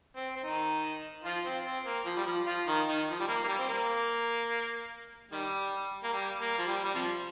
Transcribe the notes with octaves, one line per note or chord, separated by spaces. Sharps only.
C4
C4
D#3 D#4
F3 F4
C4
C4
A#3
F3
G3
F3
F3 F4
D#3 D#4
D#3 D#4
F3
G3
A#3
A#3
G3
C4
A#3
D#3 G3
A#3
G3
A#3
F3
G3
G3
C3 F3